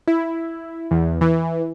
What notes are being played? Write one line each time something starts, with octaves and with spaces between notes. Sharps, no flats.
E4
E2
E3